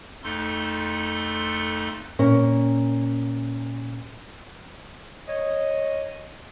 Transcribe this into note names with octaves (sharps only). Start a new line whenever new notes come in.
F2 A3 D#4 A4 C6
A#2 C#4 A#4
C#5 D#5